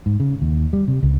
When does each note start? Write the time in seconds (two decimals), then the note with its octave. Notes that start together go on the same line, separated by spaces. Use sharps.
0.06 G#2
0.20 C#3
0.42 D#2
0.73 G3
0.88 C3
1.03 C#2